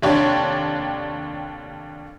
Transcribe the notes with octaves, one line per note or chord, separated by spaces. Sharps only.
F1 D#2 D4 G4 C#5